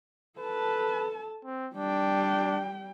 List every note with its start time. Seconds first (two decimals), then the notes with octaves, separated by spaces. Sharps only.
0.39 A4 B4 A5
1.45 C4
1.75 G3 D4 G5